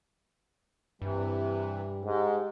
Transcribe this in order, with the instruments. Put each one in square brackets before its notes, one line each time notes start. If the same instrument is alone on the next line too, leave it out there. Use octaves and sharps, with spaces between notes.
[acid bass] G2 [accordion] C3 E3 [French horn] G3
[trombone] G#2 [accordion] G#3 [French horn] G4